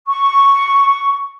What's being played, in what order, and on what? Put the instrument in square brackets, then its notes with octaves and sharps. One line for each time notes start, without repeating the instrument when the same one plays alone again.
[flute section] C#6